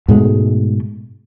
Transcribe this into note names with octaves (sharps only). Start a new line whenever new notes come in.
G#2 B2 G#3 A3